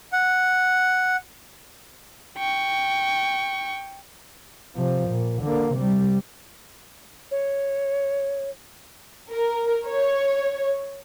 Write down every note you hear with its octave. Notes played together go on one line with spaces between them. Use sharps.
F#5
G5 C#6
C3 F3
A#2
D3 A#3
C3 G3
C#5
A#4
C#5